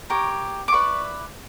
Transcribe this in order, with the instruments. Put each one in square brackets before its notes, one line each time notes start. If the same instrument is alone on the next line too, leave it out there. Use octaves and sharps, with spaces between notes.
[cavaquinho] G4 A#4 C#5 C#6
D6
E4 B4 D5 C#6